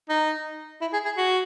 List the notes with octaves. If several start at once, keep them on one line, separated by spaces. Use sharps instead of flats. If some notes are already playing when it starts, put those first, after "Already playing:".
D#4
E4
G#4
G#4
F#4